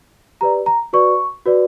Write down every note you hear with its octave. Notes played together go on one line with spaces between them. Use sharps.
G4 B4 D5 A#5
A#5
F#4 B4 D5 C#6
F#4 B4 D5